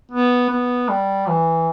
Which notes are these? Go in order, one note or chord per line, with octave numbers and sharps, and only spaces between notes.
B3
B3
G3
E3